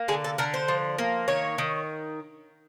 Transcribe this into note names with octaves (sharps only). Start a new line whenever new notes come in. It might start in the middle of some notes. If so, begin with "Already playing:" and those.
Already playing: A#3
D3 G#4
A4
D3 A#4
C5
F3
A#3
D#3 C#5
D#3